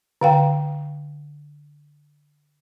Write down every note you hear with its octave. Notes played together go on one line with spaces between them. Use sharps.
D3 F5 G5